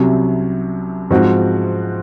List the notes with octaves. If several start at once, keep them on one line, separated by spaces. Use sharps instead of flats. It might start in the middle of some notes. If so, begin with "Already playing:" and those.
Already playing: C2 C3 F#3 C#4
G#2 F3 C4 F#4